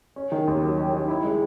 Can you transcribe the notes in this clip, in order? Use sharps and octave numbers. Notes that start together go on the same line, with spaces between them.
C#4
D#3
D#2
F#3
C#4
D#3
E4
G#3